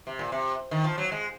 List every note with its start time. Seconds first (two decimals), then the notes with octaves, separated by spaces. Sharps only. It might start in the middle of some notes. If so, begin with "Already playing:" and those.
0.07 C3
0.19 A#2
0.32 C3
0.71 D#3
0.84 F3
0.98 F#3
1.12 G#3